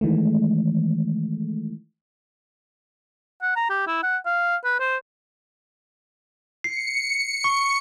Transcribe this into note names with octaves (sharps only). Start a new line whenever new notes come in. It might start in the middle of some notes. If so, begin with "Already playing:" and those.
D#3 E3 G#3 A3
F#5
A#5
G4
E4
F#5
F5
B4
C5
C7 C#7
C#6